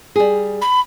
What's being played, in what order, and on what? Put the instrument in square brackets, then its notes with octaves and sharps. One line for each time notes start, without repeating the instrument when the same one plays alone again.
[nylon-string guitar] G3 G#4
[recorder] B5